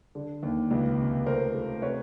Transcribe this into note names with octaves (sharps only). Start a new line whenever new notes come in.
D3
D#2
C#2
C3
A3 A#4 C5
A3
C3 B4 C#5